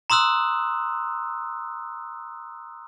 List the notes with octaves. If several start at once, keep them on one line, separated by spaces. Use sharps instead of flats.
A#5 C6 D#6 E6 F#6